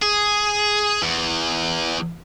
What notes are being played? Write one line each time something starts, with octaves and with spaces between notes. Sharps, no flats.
G#4
E2